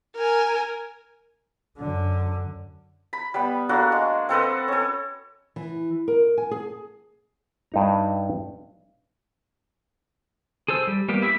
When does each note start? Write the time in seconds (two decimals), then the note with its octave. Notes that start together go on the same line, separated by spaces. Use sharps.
0.16 A#4 G#5
1.78 F#2 D3
3.13 B5
3.34 G3 B3
3.69 A#3 D4 F#4 A4
3.92 G#3
4.29 C4 A4 B4 D#5
4.68 C#4 A4
5.56 E3
6.08 A#4
6.38 G#5
6.51 G#4
7.72 G2 D#4 A#5
10.68 G#4 A4 C5 E6
10.87 G3
11.09 G3 A#3 B3 G4
11.22 E4 G4 E5 G5 B5